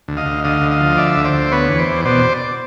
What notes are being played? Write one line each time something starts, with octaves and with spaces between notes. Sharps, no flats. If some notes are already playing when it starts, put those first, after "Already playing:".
D2
D#5 F5
D2
D3 D#5 F5
D2
D#5 F5
F3
D3 D5 E5
D2
C5 D5
D2
B3 B4 C#5
E2
C5 D5
E2
B2 C5 D5